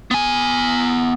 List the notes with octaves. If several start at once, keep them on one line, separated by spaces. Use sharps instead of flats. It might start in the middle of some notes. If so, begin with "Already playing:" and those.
B3 G#5